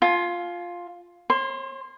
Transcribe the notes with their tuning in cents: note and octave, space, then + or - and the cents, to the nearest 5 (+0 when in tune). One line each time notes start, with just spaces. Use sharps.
F4 +5 G#5 +40
C#5 -45 C6 +0